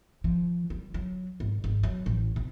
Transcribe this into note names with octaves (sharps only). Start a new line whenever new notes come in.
F3
G3
F#3
G#1
G#1
F#3
A1
C3